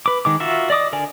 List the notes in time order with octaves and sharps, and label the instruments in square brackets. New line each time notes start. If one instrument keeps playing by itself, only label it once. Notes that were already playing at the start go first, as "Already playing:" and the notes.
[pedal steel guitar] B4 D6
D#3 G#3 D6
F4 F#4 A#4 E5
D5 D#5 D6 D#6
D3 A#4 D5 G#5